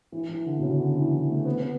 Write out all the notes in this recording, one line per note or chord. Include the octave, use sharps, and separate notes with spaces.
E3
E3
D3
B2
C#3
D3
E3
E3
A3
B3
B3